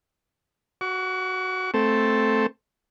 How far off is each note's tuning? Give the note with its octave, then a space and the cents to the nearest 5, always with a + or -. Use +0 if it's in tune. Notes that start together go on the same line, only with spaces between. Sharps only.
F#4 +0 C#6 +40
A3 +0 C4 +0 A4 +0